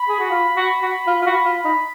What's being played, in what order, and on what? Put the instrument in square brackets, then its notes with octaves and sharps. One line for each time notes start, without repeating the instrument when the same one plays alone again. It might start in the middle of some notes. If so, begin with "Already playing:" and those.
Already playing: [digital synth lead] B5
[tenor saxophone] G#4
F#4
F4
F#4
F#4
F4
F4
F#4
F4
D#4